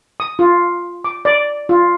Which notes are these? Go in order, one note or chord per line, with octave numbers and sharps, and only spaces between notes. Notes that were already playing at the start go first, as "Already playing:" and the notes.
D#6
F4
D6
D5
F4